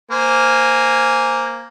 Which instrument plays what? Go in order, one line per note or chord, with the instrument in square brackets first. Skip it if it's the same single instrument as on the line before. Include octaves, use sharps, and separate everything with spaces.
[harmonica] A#3 C5 G#5